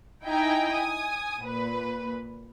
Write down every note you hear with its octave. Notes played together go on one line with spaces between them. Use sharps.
D#4 E4 G5 G#5 A#5
G#5 D#6
A#2 B4